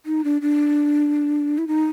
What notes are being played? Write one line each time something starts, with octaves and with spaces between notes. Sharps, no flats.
D#4
D4
D4
E4
D#4